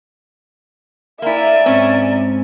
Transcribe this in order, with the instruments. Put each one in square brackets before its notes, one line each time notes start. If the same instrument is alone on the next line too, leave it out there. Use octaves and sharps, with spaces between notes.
[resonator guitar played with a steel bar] A#3 E4 [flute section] D5 G#5 A#5 [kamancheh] E5
[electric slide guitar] G#2 C4 [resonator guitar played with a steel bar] C#4